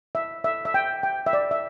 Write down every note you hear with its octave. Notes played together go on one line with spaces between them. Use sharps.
E5
E5
E5
G5
G5
E5
D5
E5